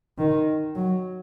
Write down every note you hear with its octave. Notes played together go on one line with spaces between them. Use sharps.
D#3
F#3